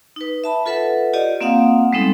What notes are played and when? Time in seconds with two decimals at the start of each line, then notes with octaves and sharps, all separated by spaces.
0.16 D#4 B4
0.44 E5 A5 B5
0.66 F4 A4 B4 E5 F#5
1.13 F4 G4 D5 D#5
1.41 A#3 C4 F4 F5 F#5 D#6
1.93 G3 G#3 B3 C4 D#4 A4